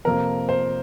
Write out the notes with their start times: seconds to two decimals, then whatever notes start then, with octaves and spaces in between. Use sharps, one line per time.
0.05 F2 C3 F3 A#3 A#4
0.49 C5